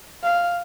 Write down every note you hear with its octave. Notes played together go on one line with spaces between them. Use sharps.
F5